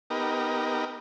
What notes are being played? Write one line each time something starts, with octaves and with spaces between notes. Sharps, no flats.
B3 D#4 G4 A#4